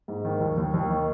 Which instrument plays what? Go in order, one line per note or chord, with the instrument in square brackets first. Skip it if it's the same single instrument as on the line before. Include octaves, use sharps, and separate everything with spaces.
[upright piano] G#2
D#3
D#2
D#2
D#2
D#3